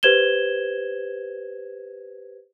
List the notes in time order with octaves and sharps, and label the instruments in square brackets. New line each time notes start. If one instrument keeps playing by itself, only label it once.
[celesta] G4 B4 C5 G#6 E7 G7